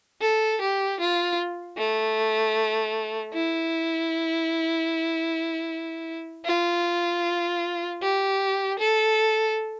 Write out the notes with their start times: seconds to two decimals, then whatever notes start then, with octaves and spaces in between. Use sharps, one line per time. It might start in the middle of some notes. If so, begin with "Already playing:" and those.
0.22 A4
0.61 G4
1.00 F4
1.77 A3
3.33 E4
6.45 F4
8.02 G4
8.79 A4